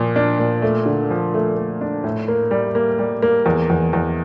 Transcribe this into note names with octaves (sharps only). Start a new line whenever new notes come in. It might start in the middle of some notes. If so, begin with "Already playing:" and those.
Already playing: A#2 F3
D4
A#2
A3
D3
F3
A3
A3
D4
A2
A#3
G3
A#3
G3
A#3
E2
E2
E2